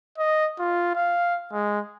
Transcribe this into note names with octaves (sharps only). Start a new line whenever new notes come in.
D#5
F4
F5
G#3